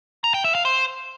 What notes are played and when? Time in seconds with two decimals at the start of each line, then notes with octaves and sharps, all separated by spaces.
0.24 A#5
0.34 G5
0.44 E5
0.55 F5
0.65 C5